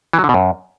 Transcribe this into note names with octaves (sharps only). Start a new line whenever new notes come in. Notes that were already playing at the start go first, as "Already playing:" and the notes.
E3
F#3
D3
B2
F#2